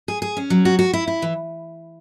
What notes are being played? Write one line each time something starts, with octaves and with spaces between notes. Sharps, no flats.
G#4
G#4
C#4
F#3
F#4
F#4
E4
E4
E3